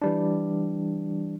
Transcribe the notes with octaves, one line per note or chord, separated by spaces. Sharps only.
E3 G3 D4